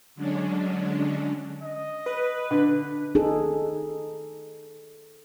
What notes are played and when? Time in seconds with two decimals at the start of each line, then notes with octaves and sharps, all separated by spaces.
0.15 D3 F#3 G#3 C#4 D4
1.63 D#5
2.06 B4
2.51 D3
3.15 D#4 G#4 A4